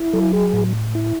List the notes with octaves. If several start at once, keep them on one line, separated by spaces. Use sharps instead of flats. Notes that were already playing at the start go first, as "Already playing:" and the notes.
Already playing: E4
F#3 A4
G#4
A2
E4